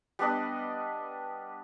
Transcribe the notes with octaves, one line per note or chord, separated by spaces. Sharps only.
G3 B3 D4 D#5